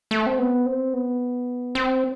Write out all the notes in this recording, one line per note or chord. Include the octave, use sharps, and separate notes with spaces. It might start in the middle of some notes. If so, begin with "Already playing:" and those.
A3
C4
B3
C4
B3
C4